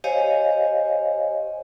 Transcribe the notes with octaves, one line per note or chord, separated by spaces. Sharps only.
G4 C5 C#5 D#5 F5 G#5